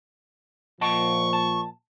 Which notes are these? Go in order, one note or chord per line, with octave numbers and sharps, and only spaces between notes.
A#2 F3 D#5 F#5 A5 C#6
A5